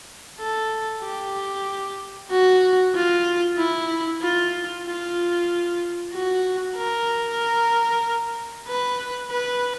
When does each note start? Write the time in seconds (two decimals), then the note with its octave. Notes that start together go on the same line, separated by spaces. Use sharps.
0.40 A4
1.03 G4
2.31 F#4
2.95 F4
3.58 E4
4.22 F4
4.86 F4
6.13 F#4
6.77 A#4
8.68 B4
9.31 B4